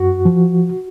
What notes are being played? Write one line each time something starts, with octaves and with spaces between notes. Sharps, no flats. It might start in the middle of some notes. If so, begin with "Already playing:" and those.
Already playing: F#2 F#4
F3